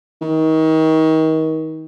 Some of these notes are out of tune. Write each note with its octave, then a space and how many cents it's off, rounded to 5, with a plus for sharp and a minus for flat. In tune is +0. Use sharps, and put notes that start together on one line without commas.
D#3 +30